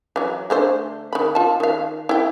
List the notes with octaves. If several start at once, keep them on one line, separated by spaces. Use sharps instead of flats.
E3 F#3
D3 A3 C5
D#3 B5
F4 A5
D#3 F5
E4 G5